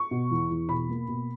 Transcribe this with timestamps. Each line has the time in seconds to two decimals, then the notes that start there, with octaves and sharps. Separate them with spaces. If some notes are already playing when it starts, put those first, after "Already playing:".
Already playing: C#6
0.11 B2
0.31 E2
0.50 E2
0.69 B2 B5
0.89 A#3
1.08 B2